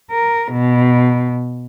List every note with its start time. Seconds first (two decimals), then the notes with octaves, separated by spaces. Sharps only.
0.11 A#4
0.52 B2